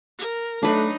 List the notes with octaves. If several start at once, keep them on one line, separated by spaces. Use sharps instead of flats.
A#4
F#3 A3 D4 D#4 B4